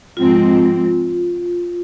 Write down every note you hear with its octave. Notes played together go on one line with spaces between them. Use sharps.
G#2 F3 G#3 C4 F4